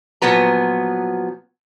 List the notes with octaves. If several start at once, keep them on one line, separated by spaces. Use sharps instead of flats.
A#2 F3 F#3 B3 B4 A#5